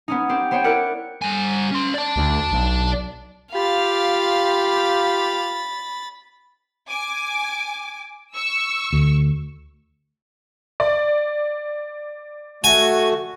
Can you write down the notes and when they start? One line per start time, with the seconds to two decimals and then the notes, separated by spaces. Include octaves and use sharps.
0.08 B3 C#4 D#4
0.29 C4 G4
0.51 B3 C5 C#5 G5
0.64 E4 A#4 D5 F#6 C#7 D7
1.22 G2 G#5
1.71 C#4 C6
1.94 D5 A5
2.16 D2
2.52 B1
3.54 F4 G4 F5 B5 A6
6.89 G#5 D6
8.34 C#6 E6
8.93 D2
10.80 D5
12.64 A3 F#4 G#5